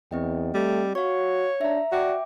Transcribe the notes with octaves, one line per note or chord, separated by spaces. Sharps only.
E2 C4 D#5 G5
G3 A3
F#4 C#5 F5 C#6
D4 E5 A#5
F#4 D5 E5 G5 D6